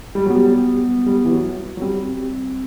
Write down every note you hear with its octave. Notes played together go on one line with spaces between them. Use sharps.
G3
F#3 B3
G3
G3
E3
F#3
F#3
G3 C4